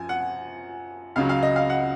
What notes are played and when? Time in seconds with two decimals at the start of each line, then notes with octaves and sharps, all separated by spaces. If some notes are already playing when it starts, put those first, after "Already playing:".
Already playing: F#2 F3 G#5
0.09 F#5
1.16 C#2 C#3 F#3 F5
1.29 F5
1.42 D#5
1.56 F5
1.70 F#5